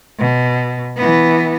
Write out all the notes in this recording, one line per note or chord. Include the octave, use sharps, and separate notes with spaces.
B2
E3 B3